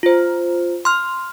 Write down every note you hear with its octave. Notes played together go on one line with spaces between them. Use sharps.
F4 C5
C6 F6